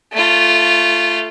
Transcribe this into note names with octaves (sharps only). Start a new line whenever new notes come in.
A3 F4